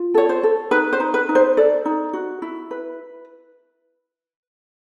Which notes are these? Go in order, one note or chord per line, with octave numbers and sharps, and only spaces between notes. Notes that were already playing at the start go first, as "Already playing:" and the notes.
Already playing: F4
A4 C#5
C5
A4
D#4 B4
C5
D#4
B4
D#4
C5
A4 D5
D#4
F#4
E4
B4